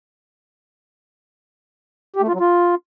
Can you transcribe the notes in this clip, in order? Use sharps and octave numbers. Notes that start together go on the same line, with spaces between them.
G4
A3
F4
F#3
F4